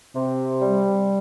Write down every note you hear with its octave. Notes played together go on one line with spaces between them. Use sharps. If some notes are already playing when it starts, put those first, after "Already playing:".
C3
G3